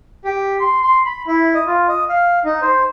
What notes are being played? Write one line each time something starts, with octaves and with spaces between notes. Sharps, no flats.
G4
C6
C6
B5
E4
D#5
F4
D#5
F5
D#4
C5